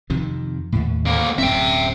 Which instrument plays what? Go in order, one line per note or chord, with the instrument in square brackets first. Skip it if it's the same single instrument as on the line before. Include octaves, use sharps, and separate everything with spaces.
[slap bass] F2 C3 D#3
D#2 A2
[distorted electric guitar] D2 A#3
[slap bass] D1 F#2 C4 [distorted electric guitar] E5 G5